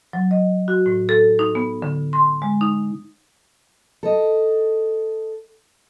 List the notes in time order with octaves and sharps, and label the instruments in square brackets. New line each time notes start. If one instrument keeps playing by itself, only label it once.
[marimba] F#3
D#5
F#4
A2
A4
D#4
B3
D3
C6
G#3
D#4
[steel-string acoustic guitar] A4 D#5